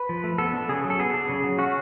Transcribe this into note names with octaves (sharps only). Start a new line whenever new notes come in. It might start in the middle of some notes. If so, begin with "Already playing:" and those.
Already playing: B4
F3
A3
B3 A4
D4
C#3 G#4
F#3
A4
B3 G#4
D4
C#3
F#3
C#4 F#4